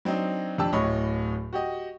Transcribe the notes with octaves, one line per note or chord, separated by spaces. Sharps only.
F#3 C4 D4 D#4
F2 D4 G4 A5 E6
D1 A2 C#5 D#5
F#4 G4 D#5